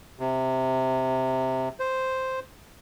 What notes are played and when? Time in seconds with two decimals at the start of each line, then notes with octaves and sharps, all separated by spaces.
0.19 C3
1.80 C5